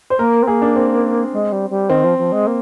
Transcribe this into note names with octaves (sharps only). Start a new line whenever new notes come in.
C5
A#3 A#4
C4
A#3 G#4
D4
C4
G#3
G3
G3
D#3 C4
F3
F3
G#3
A#3